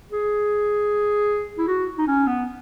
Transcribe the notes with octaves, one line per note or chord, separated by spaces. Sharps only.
G#4
E4
F#4
D#4
C#4
B3